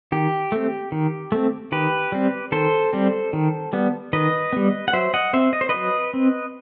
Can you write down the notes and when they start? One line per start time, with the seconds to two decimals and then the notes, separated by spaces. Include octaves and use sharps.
0.12 D#3 G4
0.52 A3 C4
0.92 D#3
1.32 A3 C4
1.72 D#3 G4 B4
2.12 G3 C4
2.52 D#3 A4 C5
2.93 G3 C4
3.33 D#3
3.73 G3 B3
4.13 D#3 B4 D#5
4.53 G3 B3
4.88 F#5
4.93 F#3 C5 E5
5.14 D#5 F#5
5.33 C4 C5 E5
5.53 D#5
5.61 C5
5.69 F#3 B4 D#5
6.14 C4